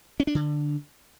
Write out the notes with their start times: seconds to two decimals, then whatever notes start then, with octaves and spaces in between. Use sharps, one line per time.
0.20 C#4
0.27 D4
0.35 D3